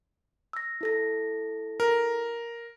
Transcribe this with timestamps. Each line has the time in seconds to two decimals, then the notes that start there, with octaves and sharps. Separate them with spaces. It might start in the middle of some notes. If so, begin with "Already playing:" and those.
0.53 E6 A#6
0.81 E4 A4 A#6
1.80 A#4